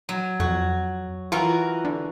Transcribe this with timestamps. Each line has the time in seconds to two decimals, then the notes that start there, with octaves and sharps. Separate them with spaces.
0.09 F#3
0.40 F2 F#4
1.32 E3 F4 F#4 A#4
1.85 D3